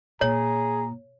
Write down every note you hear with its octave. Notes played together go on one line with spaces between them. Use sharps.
A#2 G#4 C#5 A#5